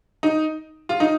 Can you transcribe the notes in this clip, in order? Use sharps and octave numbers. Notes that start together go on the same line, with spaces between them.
D#4
F4
D#4